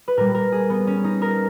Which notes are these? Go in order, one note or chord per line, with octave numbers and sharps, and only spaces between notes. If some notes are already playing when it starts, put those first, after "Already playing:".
B4
A#2 G3 A#4
A#4
G#4
B3
C#4
D#4
A#4